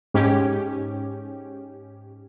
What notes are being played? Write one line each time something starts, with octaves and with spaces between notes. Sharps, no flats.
G#2 C#4 G4